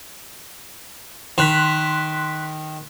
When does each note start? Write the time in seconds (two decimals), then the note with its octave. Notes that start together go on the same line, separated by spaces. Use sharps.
1.38 D#3 C6 F#6 B6